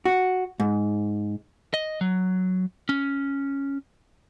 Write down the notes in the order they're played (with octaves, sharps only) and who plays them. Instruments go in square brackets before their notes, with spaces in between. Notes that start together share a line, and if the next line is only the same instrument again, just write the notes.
[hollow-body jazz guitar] F#4
G#2
[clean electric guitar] D#5
F#3
C#4